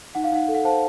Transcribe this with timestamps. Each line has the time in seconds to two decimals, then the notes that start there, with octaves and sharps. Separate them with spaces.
0.15 D#4 F#5
0.24 F5
0.32 D#4 F#5
0.48 A4
0.55 F#5
0.64 C5 F5 A5